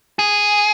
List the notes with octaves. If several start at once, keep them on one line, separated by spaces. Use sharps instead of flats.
G#4